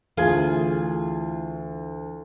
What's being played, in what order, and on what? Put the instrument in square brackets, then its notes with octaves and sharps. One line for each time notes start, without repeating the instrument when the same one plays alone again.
[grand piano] D2 [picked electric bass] E3 [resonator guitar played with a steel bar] F4 G#4